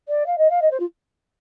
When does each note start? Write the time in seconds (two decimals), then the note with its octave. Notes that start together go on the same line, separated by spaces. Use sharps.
0.08 D5
0.26 F5
0.38 D#5
0.50 F5
0.62 D#5
0.71 C5
0.80 F4